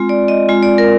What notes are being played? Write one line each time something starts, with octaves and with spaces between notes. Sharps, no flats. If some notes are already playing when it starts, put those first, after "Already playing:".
Already playing: G#3 C4 F4
D5
D#5
G#3 C4 F4
D5
A#4